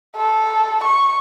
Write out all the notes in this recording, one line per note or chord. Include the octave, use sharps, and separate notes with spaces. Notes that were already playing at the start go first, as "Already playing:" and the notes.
A4
C#6